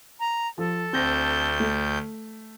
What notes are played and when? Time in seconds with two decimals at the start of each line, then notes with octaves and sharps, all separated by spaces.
0.20 A#5
0.58 F3 A4
0.93 D2 C4 G6 A#6
1.60 A3